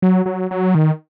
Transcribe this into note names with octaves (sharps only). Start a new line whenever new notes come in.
F#3
F#3
F#3
D#3